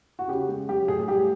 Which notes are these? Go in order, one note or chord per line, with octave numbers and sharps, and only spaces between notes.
F#4
C#3 G4
G#3
F#3 G4
A2 G#4
G#4
G3 G4